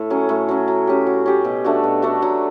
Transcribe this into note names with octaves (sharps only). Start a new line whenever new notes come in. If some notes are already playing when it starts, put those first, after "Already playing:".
Already playing: A2
F#3 C#4
A2
F#3 C#4
F#3
C#4 G4
F#3
C#4 G4
B2
A3 D4 F#4
B2
A3 D4 F#4
F#3